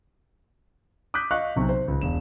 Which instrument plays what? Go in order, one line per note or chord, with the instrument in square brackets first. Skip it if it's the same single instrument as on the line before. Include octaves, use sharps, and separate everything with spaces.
[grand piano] D6 D#6 F#6 G6 B6
D#5 F5 C#6 F#6
B1 C3 C#6
C5
C#2
E1 E7